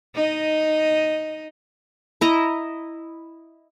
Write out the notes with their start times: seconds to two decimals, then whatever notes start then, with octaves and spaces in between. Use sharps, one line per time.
0.15 D#4 D#5
2.21 E4 D#5 A#5